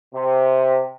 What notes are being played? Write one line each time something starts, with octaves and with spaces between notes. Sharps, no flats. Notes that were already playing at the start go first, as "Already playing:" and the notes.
C3